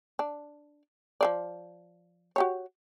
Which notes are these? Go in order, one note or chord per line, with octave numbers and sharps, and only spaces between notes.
D4
F3 C5 D5
F#4 G4 C#5